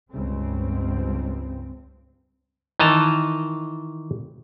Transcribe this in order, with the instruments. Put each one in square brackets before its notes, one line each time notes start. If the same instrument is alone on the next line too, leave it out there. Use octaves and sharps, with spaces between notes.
[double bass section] C#2 G2 C4
[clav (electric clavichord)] D#3 E3 D#5 A5 A#5